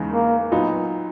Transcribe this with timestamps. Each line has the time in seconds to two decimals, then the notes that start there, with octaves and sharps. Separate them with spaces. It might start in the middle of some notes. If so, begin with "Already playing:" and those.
Already playing: E2 C#3 G#3 D#4
0.12 A#3
0.52 A#2 F#3 B3 D#4